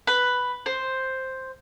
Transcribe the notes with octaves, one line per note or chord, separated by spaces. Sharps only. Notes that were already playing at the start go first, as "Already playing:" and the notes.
B4
C5